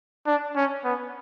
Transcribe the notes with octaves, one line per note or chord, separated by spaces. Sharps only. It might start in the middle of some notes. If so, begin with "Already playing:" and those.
D4
C#4
B3